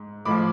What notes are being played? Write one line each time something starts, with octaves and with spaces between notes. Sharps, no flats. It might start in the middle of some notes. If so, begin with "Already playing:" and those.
Already playing: G#2
A2 F3 B5 D6